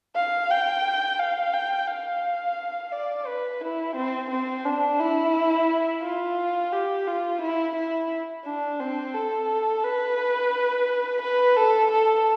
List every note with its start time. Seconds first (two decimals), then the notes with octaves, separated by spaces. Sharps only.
0.15 F5
0.50 G5
1.19 F5
1.54 G5
1.88 F5
2.92 D5
3.27 B4
3.61 E4
3.96 C4
4.30 C4
4.65 D4
5.00 E4
6.03 F4
6.72 G4
7.07 F4
7.42 E4
7.76 E4
8.45 D4
8.80 C4
9.14 A4
9.84 B4
11.22 B4
11.57 A4
11.91 A4